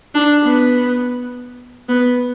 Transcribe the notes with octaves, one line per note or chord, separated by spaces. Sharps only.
D4
B3
B3